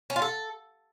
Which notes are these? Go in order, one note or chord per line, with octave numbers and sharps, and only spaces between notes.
C#4
F4
A4